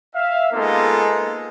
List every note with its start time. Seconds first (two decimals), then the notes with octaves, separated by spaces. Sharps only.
0.15 E5 F5
0.53 G#3 A#3 B3 D#4 F4 A4